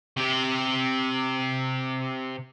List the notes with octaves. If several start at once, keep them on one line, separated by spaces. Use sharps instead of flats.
C3 G4